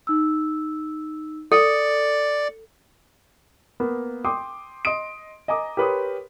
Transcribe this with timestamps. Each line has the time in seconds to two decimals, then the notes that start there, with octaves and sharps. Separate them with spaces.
0.07 D#4 E6
1.52 A4 D5 C#7
3.80 A#3 B3
4.25 G5 C6 D6 D#6
4.85 D#5 C6 D#6 D7
5.48 D#5 G#5 A#5 D6 D#6
5.77 G4 A#4 B4 C#5 C6 D#6